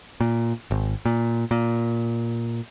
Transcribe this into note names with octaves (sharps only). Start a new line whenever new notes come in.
A#2
G#1
A#2
A#2